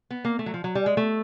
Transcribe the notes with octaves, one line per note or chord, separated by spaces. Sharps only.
B3
A#3
A3
F#3
F3
F#3
G3
G#3
A3